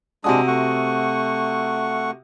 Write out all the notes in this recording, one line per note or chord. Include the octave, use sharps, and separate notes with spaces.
C3 G#3 D4 F#4 D#6
A3 F#5 C#6